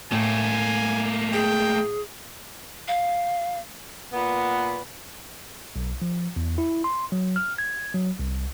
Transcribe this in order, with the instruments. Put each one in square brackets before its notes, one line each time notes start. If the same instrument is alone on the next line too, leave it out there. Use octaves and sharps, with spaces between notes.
[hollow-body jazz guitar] A2 [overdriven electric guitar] A3 A#3 [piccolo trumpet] G#5
[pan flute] G#4 [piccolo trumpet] G5
[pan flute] F5
[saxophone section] A#2 B3
[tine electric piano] B1
F3
E2
E4
C6
F#3
F6
G#6
F#3
C2